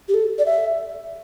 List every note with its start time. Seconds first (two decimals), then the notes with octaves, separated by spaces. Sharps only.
0.08 G4
0.14 A4
0.39 D5
0.46 E5